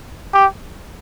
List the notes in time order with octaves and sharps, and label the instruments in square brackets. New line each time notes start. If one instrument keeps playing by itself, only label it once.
[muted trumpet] G4